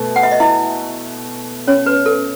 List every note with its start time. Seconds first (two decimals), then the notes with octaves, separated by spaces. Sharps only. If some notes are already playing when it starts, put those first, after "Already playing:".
Already playing: B2 A3
0.16 F#5
0.23 E5
0.31 D#5
0.40 E4 E5
1.67 C#4 C#5
1.86 B4
2.06 A4